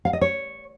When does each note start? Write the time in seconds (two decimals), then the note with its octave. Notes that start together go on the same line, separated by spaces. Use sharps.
0.05 F5
0.13 D#5
0.21 C#5